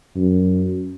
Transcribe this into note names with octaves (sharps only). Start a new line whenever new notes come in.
F#2